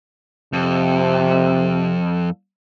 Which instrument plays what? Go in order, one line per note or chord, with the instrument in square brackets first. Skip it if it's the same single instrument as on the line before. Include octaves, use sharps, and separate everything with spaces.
[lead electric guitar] F2 [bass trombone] C3